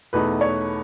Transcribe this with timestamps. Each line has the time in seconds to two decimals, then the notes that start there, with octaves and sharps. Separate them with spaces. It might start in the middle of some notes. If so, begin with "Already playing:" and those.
0.13 E2 B2 A3 D#4 B4
0.41 C#5